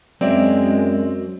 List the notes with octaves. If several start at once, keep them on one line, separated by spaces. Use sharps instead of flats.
F#2 F#3 G#3 C4 D5 E5